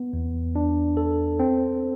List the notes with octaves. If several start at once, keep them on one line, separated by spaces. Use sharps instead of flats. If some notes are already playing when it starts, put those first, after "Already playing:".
Already playing: B3
E2
D4
A4
C4